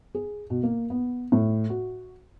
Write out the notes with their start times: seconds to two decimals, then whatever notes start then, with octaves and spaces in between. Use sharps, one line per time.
0.15 G#4
0.50 B2
0.63 A#3
0.90 B3
1.32 A2
1.70 F#4